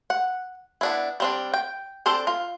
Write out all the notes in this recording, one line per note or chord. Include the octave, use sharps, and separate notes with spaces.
F#5
B3 D4 E4
G3 C4 D4
G5
C4 D4 A4 C5
F4